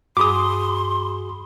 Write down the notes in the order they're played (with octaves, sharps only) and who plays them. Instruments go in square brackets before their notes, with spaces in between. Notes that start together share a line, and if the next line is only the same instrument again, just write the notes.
[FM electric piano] G2 B5 [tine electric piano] F#4 G#4 [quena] C6 [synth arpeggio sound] D6 D#6